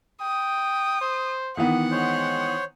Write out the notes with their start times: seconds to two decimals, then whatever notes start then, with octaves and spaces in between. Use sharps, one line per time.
0.21 G5 D#6
1.01 C5
1.57 D#3 E3 B3 F#5
1.92 G#3 C5 C#5